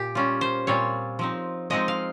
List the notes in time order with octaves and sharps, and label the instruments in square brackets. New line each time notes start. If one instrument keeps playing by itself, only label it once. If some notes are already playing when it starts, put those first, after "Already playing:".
Already playing: [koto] A#2 G4
G3 C#4 F4
C5
A#2 G3 C4 F4 C#5
F3 C4 D#4
F3 G#3 C4 D#4 D#5
F5